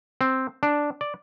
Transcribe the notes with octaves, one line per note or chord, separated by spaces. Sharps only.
C4
D4
D5